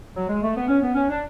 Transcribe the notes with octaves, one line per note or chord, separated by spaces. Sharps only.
F#3
G#3
A3
B3
C#4
B3
C#4
D4